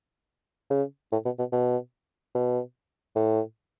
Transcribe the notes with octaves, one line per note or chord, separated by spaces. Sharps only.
C#3
A2
B2
B2
B2
B2
A2